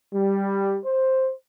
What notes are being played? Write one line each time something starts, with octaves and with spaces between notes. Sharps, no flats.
G3
C5